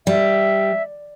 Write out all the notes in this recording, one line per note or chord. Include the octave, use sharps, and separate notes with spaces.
G3 E5